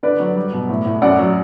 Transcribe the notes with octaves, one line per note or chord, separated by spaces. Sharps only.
D3 B4 D5
F#3
G3
B2
A2
A2
F#2 D5 F#5
F#3